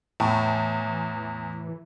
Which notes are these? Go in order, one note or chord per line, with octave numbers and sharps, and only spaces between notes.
E2 A2 E3